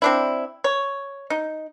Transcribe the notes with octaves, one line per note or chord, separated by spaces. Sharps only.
C4 D4 E4
C#5
D#4